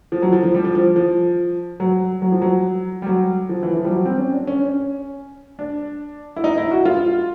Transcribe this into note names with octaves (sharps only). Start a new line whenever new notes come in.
F3
F#3
F3
F3
G3
F3
F3
F3
F#3
F#3
F3
F#3
G3
F#3
F3
E3
F3
G3
F#3
C4
C#4
D4
C#4
C#4
D4
E4
D#4
E4
F#4
F4